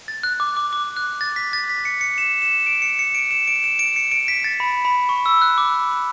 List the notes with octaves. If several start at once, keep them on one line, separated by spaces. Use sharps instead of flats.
A6
F#6
D6
D6
D6
F#6
A6
B6
A6
B6
C#7
C#7
E7
E7
D7
C#7
C#7
D7
E7
D7
E7
D7
C#7
D7
B6
A6
B5
B5
C#6
E6
F#6
D6